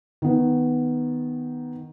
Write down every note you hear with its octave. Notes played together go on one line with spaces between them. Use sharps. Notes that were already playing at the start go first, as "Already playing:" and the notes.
D#3 B3